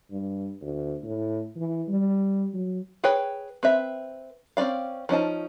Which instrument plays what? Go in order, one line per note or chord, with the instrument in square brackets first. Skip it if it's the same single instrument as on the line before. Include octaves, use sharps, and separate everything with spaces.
[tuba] G2
D2
A2
E3
G3
F#3
[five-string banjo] G#4 B4 C#5 G5
C4 B4 E5
C4 C#4 F4 D5 F5
F3 C#4 D#4 A5